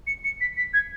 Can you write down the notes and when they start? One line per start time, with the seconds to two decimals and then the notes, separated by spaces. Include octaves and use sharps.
0.07 C#7
0.24 C#7
0.41 B6
0.57 B6
0.74 G#6